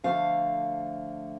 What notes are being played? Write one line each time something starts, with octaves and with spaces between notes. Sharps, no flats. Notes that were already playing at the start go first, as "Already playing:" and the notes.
D3 F3 A3 F5